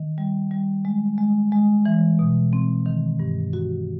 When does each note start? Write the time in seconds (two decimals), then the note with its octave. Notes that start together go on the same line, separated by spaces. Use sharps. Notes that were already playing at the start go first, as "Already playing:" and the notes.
Already playing: D#3
0.18 G3
0.51 G3
0.85 G#3
1.18 G#3
1.52 G#3
1.86 E3
2.19 B2
2.53 C4
2.86 D#3
3.20 G2
3.53 F#4